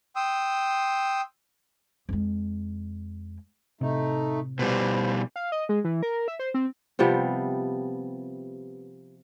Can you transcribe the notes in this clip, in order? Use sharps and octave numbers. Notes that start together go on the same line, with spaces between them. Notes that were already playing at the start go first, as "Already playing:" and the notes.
G5 C6 D#6 E6
F2 G#3
A2 C3 A3 D#4
B2 G3 B4 C5
F5
D#5
G#3
E3
A#4
E5
C5
C4
C3 F3 G3 B3